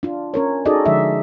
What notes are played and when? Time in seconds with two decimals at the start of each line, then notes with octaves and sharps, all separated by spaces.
0.03 D4 F4
0.34 C#4 A#4 C#5
0.66 D#4 F#4 G#4 A4 D5 D#5
0.86 D3 F3 G#3 E5